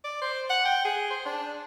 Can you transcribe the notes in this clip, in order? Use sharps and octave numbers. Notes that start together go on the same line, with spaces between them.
D5
C5
F#5
G5
G#4
C5
D4